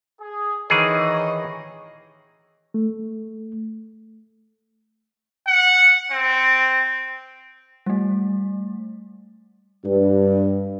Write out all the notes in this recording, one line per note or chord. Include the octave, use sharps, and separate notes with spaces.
G#4
D#3 E3 G#4 C#5 D#5
A3
F#5
C4
G3 A3
G2